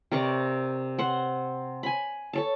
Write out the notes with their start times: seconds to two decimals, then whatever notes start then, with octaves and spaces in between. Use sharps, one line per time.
0.12 C3 A#4 D5 C#6
0.99 C5 F#5
1.83 G#5 B5
2.33 A4 C#5 A5